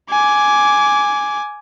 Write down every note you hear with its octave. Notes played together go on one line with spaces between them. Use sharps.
G#5 D6